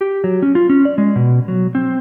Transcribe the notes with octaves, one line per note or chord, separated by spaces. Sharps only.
G4
F#3
C#4
F4
C#4
D5
G#3
B2
F#3
C4